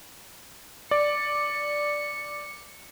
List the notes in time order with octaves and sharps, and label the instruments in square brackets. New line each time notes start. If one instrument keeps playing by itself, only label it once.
[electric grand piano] D5 [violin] C#7